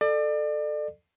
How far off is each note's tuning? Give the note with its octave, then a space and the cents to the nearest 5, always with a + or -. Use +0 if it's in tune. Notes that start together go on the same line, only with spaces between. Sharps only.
A4 +0 D5 +35